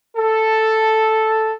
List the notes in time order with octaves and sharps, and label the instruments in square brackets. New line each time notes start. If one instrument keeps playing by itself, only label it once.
[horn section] A4